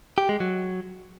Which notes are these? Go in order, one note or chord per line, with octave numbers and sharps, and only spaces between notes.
G4
G#3
F#3